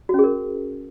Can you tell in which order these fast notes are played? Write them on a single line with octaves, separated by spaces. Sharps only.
F#4 C#4 G#4 A#4